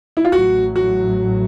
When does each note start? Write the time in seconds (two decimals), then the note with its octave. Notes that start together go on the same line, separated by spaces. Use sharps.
0.17 E4
0.25 F4
0.32 A1 A2 F#3 F#4
0.76 F#4